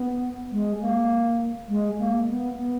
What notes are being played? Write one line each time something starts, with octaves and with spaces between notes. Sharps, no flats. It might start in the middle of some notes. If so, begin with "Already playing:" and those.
Already playing: B3
G#3
A#3
G#3
A#3
B3
B3